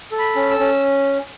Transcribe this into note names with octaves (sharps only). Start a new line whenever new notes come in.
A4
B5
C#4
E6
C#4